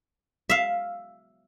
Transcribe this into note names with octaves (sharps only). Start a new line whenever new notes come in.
E5 F5